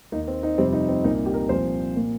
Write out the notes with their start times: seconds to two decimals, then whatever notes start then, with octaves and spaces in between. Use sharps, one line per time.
0.12 D#2 D#3 A#3 D#4
0.28 C4
0.43 D#4
0.58 F2 C3 G3 C4
0.73 D#4
0.89 C4
1.04 C2 A#2 A#3 D#4
1.26 G4
1.34 A#4
1.49 C2 A#2 F3 C5
1.96 A#2 A#3